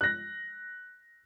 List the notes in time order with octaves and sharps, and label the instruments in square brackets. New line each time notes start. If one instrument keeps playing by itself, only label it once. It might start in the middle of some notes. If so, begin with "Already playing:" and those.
[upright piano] F#6 A#6